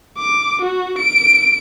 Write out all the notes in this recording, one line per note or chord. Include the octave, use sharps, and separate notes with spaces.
D6
F#4
D7